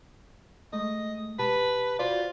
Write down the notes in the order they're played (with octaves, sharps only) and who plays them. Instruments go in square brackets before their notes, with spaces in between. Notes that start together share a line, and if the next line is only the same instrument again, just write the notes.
[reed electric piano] G#3 A3 [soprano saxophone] D#5
[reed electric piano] B2 G4 A5 [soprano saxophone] B4
[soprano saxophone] F4 [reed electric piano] F#4 C5 D5